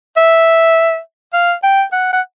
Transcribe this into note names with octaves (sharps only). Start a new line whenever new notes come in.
E5
F5
G5
F#5
F#5